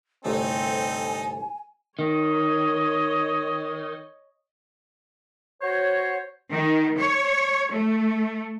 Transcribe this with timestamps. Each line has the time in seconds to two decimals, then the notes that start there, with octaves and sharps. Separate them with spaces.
0.25 G1 C2 A3 C4 D#4 A4 G#5
1.99 D#3 C#5 D#5
5.62 F#4 C5 C#5
6.52 D#3
6.98 C#5
7.70 A3